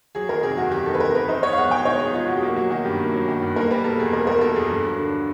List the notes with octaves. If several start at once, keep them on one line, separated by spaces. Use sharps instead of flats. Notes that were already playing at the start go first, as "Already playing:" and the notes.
F#3 G#4
D#3 A#4
C3 G#4
E2 F#4
F#3 G4
D#3 A4
B4
C3 A#4
E2 B4
D#4 C5
B3 C#5
F5
G#3 F#5
B2 G5
D#4 C#5
B3 G#4
G#3 F4
B2 F#4
G4
A#3 F#4
F#3 F#4
D#3 F#4
G2 G4
A#3
F#3
D#3
G2
A#3 A#4
G3 B4
B2 A4
E2 G#4
A#3 A#4
G3 A#4
B2 A4
E2 G#4
G2 A4
F#3
D3